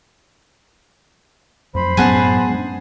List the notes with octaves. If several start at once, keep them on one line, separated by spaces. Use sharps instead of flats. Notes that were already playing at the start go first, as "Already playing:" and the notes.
F2 F#3 A3 C5 B5
F#2 A2 F#3 B3 C#4 G#4 F#5 A5
G#3 C4 D4